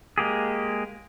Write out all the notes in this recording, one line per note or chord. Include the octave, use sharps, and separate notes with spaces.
G#3 A#3 G4 G#4